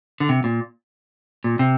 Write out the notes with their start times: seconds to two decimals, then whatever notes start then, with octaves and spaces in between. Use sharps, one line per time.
0.20 D3
0.29 C3
0.44 A#2
1.44 A#2
1.59 C3